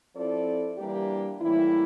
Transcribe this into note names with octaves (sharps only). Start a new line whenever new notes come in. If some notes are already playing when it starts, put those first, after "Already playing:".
F3 C4 E4 A4 D5
E3 G3 A#3 D4 G4
A2 E3 G3 A#3 E4